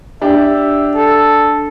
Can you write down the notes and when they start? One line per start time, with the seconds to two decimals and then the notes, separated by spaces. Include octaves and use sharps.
0.22 D4 G4 E5
0.94 A4